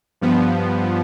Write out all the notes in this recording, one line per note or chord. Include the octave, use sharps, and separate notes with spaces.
G2 F3 B3